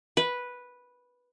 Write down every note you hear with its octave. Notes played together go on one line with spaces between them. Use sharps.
B4